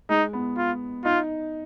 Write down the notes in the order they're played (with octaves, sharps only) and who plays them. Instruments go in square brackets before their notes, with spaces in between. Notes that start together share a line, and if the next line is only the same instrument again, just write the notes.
[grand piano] G#3 [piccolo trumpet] D#4
[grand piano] B3
[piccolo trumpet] F4
[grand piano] D#4 [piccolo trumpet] F4